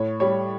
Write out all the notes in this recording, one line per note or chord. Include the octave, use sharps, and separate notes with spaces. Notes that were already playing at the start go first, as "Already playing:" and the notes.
Already playing: A2 C#5
G3 C#5